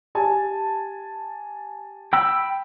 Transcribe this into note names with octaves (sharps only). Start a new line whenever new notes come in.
G4 G#5 A5
G5 B5 E6